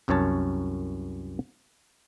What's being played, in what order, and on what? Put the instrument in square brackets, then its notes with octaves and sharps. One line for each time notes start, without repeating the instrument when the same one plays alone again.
[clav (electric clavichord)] C2 F#2 C#4 C#5 A5